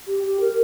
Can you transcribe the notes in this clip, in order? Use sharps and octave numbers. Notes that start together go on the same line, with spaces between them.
G4
G4
A#4